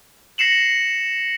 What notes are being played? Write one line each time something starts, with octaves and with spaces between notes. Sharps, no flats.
A#6 C7 C#7 E7 F#7